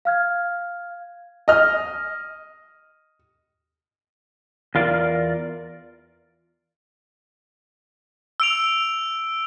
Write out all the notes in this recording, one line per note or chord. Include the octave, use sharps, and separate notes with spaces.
F5 F6 G#6
D#5 F6
E2 F4 A#4 D5
E6 D7 F7